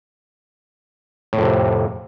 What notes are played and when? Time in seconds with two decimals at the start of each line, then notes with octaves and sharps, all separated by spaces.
1.33 A2
1.38 F2
1.42 C3